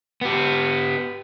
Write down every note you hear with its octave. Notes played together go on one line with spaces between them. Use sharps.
B3 G4